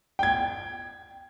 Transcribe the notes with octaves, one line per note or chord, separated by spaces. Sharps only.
G5 G#6